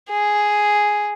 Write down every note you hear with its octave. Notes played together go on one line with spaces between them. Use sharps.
G#4